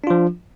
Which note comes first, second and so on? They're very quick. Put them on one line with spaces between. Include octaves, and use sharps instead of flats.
D4 F4 F3